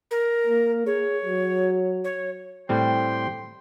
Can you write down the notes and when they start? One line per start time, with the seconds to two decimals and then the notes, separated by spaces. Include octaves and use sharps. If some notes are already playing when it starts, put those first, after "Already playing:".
0.11 A#4
0.47 A#3
0.86 G#4 C#5
1.25 F#3
2.04 C#5
2.69 A2 G3 C4 G4 G5 C6